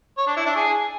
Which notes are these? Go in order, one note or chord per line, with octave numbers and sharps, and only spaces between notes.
C#5
D4
E4
D4
G#4